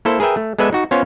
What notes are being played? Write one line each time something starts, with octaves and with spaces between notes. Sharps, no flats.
A#3 E4 A4 C5
G#4 A#4 B4 E5 G5
A3
G#3 B3 A4 B4 D5 E5
D#4 F#4
B3 C#4 F4 C5 C#5 F5